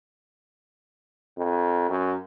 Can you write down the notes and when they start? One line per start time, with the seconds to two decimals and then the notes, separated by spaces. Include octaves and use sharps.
1.37 F2
1.89 F#2